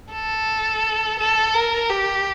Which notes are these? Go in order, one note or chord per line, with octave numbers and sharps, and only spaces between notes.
A4
A4
A#4
G4